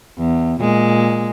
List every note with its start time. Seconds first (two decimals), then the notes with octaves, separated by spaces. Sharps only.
0.18 E2
0.61 A#2 G#3